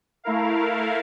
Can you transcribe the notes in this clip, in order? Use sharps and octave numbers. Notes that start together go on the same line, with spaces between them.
A3 E4 A#4 F5